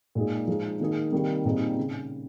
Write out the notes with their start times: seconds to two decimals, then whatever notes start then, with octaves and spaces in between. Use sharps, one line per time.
0.15 A#2 G#3 D#4 G#4
0.47 F3 G#3 D#4 G#4
0.80 D#3 A#3 D#4 G#4
1.12 C3 D#3 G3 A#3
1.45 A#2 G3 C4 D#4 G#4
1.77 C#3